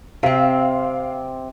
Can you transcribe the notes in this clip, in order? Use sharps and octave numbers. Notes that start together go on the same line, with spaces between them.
C3 C4 F5